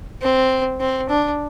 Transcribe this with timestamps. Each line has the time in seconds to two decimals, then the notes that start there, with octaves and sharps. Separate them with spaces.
0.22 C4
0.80 C4
1.09 D4